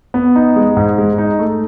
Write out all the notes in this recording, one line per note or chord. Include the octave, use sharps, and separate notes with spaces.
B3
D#4
G#3
G#2
G#3
D#4
A3